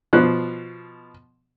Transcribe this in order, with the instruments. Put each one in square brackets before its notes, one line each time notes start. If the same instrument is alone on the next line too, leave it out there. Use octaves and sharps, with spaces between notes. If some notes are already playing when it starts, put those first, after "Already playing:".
[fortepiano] B2 F3 F#6